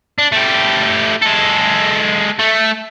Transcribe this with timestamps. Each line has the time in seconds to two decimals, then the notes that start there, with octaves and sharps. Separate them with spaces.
0.19 D4
0.32 A3 G4
1.22 G#3 A4
2.39 A3